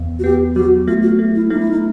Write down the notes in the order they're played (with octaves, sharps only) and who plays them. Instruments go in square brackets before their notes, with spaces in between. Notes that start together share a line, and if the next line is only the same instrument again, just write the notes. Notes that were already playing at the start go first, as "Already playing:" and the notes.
Already playing: [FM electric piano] E2 B3
[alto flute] F#4
[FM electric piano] B3 [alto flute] G4
[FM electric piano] F#3 [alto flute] F#4
[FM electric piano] A3 [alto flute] F4
[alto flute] F#4
[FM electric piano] A3
[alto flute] E4
[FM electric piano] A3 [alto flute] D#4
[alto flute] E4
D#4